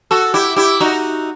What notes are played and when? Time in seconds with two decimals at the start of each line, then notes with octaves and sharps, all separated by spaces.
0.11 F#4 A4
0.34 E4 G4
0.56 E4 G4
0.80 D#4 F#4